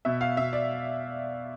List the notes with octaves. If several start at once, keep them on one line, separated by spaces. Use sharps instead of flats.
B2 E5
F5
B2 E5
D5